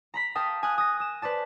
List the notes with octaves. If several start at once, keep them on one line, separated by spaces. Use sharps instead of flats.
A#5 B5 B6
A#4 F5 G5 A5 D#6
G#5 D#6 F6 F#6
D#6 A#6
D#6 E7
B4 C5 D5 A5